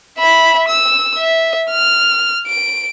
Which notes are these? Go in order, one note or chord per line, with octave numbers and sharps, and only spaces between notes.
E5 B5
E6
E5
F6
D7